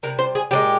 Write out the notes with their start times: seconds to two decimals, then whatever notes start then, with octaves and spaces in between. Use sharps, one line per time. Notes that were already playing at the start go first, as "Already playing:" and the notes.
0.03 C3 G3 A#4
0.19 C5
0.35 G#4
0.51 A#2 F3 G#3 G4